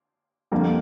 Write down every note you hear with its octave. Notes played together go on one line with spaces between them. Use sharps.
F2 D3 G3 A#3